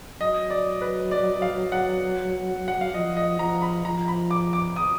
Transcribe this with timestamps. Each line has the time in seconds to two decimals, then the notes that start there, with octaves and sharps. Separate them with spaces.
0.21 F#3 D#5
0.50 D5
0.81 B4
1.11 D5
1.42 F5
1.72 F#5
2.68 F#5
2.81 F5
2.94 F3 D#5
3.17 D#5
3.39 F3 A#5
3.62 B5
3.85 F3 A#5
4.08 B5
4.31 D6
4.53 D6
4.76 D#6